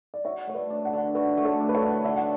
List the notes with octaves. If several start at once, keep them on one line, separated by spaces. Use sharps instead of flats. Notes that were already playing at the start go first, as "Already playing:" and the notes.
D5
F#4 C#5 E5
A3 C#5
B4 D5
D4
D5 F#5
D3
F#4 B4 D5
A3
A4 C#5
D4
B4
A4 C#5
D3
D3 E5
F#5